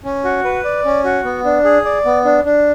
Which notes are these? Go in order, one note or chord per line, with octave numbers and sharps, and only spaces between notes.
C#4
F#4
B4
D5
C#4
F#4
B3
D4
G#4
D5
B3
D4
D4